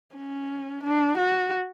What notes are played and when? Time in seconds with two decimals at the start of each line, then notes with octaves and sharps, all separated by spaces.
0.16 C#4
0.83 D4
1.17 F#4